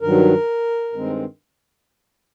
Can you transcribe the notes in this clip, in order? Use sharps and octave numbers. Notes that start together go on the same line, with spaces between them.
G2 D#3 F#3 A#4
G2 D#3 G#3 C4